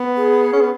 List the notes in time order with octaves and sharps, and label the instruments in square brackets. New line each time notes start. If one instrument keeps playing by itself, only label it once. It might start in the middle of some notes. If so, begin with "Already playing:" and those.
Already playing: [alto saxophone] B3
[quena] G#4
[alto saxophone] C#4
B3